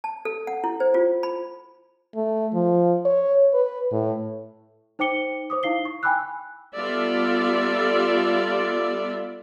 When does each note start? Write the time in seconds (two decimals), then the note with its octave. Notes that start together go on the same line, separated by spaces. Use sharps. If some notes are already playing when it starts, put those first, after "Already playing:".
0.04 A5
0.25 A4
0.47 F#5
0.64 E4
0.80 C5
0.94 F4
1.23 B5
2.16 A3
2.54 F3
3.05 C#5
3.54 B4
3.92 A2
4.99 D#4 C5 G5 D6 C#7 G7
5.50 C5 D6 D#6
5.63 D#4 E4 F5 C7 G7
5.85 C#6
6.03 G5 G#5 B5 D6 E6 F#6
6.75 G3 B3 F4 A4 D5 E5